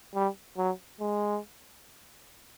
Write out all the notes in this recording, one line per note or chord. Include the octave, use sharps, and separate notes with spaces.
G3
F#3
G#3